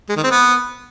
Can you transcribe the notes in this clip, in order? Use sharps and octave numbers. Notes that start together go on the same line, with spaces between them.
G#3
D#3
C4
B3